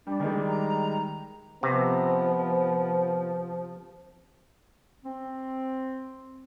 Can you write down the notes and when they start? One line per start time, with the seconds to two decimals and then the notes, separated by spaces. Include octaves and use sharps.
0.07 G3 D4
0.20 D#3 G3 G#3
0.48 A#5
1.63 C3 F3 B3
5.05 C4